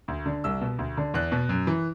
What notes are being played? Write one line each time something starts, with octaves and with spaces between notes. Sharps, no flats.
D2
D3
C2 E6
B2
D2
D3
E2 F#6
B2
F#2
E3